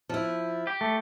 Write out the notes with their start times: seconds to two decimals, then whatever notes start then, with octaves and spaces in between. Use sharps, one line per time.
0.09 F3 E4
0.67 G4
0.81 A3